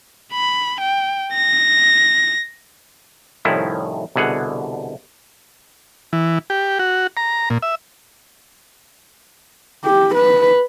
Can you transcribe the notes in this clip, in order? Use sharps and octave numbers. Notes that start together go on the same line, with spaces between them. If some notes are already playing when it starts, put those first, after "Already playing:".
B5
G5
A#6
C2 A2 D#3 F3 C#4 E4
C2 B2 D3 G#4 F#5
E3
G4
F#4
A#5
A#2
E5
G4
B4